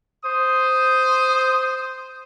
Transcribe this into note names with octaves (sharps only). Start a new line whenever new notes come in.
C5 D#6